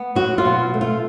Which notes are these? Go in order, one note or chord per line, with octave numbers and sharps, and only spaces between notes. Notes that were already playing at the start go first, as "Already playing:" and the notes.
Already playing: B3
F#3 F#4
F4
B2
A3
F4